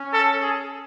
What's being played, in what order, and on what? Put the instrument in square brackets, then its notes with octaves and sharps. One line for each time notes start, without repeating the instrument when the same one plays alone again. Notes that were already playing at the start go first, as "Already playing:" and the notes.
Already playing: [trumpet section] C#4
[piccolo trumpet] A4
G#4